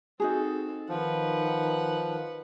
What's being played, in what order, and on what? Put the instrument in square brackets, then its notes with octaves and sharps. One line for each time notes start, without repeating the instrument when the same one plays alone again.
[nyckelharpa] C4 A4 [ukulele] D#4 F#4 G#4
[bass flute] D#3 [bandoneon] F3 [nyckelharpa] B4 F#5